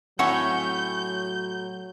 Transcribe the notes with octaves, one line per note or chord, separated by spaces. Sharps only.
A2 F#3 C4 C#5 E5 F#5 G#5 G6